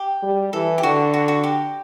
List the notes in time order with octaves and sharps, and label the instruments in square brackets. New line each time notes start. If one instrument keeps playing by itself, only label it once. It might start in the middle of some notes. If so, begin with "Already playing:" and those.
Already playing: [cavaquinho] G4
[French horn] G3
[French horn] E3 [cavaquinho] A4
[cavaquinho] G4
[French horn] D3 [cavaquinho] F#4
[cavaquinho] F#4
F#4
G4